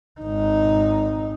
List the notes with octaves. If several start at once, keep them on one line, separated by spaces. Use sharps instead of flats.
G#1 D#4